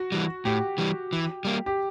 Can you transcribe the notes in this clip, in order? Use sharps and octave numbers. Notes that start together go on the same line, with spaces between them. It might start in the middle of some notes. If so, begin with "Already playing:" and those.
Already playing: F#4
E3 G3
A2 G4
E3 G3
E3
G3 A#3
G4